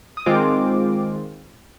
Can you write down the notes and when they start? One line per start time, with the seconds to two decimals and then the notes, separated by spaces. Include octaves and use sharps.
0.17 D#6
0.26 D#3 G#3 C4 F4 D6